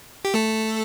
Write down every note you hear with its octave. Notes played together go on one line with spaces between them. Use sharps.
G4
A3 A4